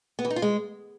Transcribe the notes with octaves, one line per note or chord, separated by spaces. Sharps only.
B3
E3
D#4
F4
G#3